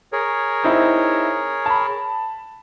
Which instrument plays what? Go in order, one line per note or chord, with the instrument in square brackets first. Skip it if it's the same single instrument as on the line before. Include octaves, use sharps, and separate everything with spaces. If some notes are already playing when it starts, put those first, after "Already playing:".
[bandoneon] G#4 A#4 C#5
[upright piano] C4 D#4 E4
A5 B5